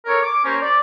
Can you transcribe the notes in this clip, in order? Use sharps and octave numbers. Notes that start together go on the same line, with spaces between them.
A4 A#4 C#5
D6
A#3 C#4 G4 C5 C#5
D5